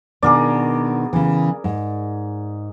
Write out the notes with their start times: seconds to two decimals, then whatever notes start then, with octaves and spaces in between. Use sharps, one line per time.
0.23 B2 D#3 D4 G#4 A#4 D5
1.13 C#3 E3
1.64 G#2